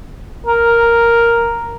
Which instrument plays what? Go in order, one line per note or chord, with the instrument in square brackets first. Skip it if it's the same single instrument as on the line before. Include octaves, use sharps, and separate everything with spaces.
[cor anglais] A#4